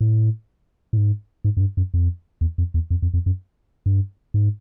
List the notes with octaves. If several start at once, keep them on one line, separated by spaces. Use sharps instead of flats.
A2
A2
G#2
G#2
F#2
G2
F#2
F2
E2
F2
E2
F2
F2
F2
F#2
G2
G#2